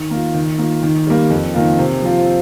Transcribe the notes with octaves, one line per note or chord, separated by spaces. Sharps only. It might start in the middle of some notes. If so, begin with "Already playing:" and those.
Already playing: D#3
A#3 F4
D#3
A#3 F4
D#3
G3 A#3
F2
D#3 A#3 F4
C3
F3 C4 F4